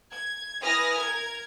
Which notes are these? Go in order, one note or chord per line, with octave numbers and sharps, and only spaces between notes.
G#6
E4 B4 G#5 D#6 F6 A#6
A#4 G#6